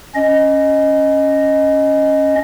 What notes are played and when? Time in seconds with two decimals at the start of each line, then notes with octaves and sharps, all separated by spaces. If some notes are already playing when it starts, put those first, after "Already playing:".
0.15 C#4 D#5